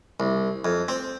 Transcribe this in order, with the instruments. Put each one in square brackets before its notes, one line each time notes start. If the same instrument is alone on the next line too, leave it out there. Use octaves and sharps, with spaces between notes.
[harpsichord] C2
F2
C4